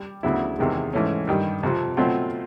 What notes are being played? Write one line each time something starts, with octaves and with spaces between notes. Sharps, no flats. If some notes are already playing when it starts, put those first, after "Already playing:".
Already playing: G3
D2 C#3 F#3 B3 E4
E2 C3 D#3 G#3
G#2 E3 A3 C#4
G2 D#3 G3
F2 C3 F3
B2 F#3 A3 C4 F4